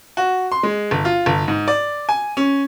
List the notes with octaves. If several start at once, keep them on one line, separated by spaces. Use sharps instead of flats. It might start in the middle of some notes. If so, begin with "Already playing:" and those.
F#4
C6
G#3
G1
F4
G1
G#2
D5
G#5
C#4